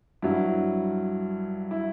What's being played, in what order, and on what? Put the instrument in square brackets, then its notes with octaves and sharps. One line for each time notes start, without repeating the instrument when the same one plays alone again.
[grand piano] G2 F#3 E4
E4